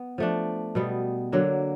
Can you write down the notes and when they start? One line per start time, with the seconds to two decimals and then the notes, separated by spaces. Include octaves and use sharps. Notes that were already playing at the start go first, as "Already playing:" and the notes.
Already playing: B3
0.18 F3 A3 D4
0.75 B2 G3 B3
1.32 D3 F#3 A#3